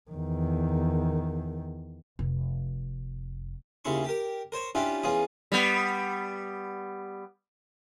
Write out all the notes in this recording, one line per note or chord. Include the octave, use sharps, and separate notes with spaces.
E2 D#3
F1
D#2 C#3 E4 C6 C#6
G4 A#4
A#4 C5 C#5
C#4 D4 E4 F4 G4
E2 C#4 F4 G#4
G3 B3